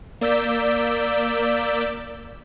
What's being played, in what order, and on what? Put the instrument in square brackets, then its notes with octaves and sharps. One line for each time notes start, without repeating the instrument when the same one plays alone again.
[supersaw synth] A#3 D5 E6 G6 B6